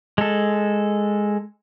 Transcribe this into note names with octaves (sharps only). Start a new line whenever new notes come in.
G#3 A4